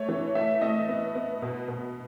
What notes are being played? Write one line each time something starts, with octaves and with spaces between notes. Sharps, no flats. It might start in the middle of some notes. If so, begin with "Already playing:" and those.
Already playing: A3 C#5
E3
A3 E5
A3 D#5
B3
B3
B2
B2